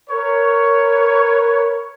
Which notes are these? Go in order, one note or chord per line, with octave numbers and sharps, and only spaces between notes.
A#4 B4 C#5